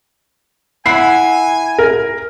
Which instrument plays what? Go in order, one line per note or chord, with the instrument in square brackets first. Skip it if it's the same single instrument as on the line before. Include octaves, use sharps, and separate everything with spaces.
[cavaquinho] E4 F#5 B5 [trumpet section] G#5 [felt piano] C7
[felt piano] A#4